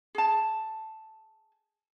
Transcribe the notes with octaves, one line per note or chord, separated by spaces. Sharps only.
G#4 A5